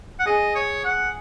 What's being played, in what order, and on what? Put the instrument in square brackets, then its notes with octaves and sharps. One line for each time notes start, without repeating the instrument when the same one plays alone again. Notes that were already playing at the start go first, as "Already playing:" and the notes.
[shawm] F#5
[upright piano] G#4 [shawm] D#5
[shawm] C#5
F#5